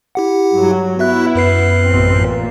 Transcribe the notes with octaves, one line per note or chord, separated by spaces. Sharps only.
E4 G4 F#5
G2 F#3
B3 E4 F#4 E5 F#6
F#2 B4 C7
A1 B2 C4
A#2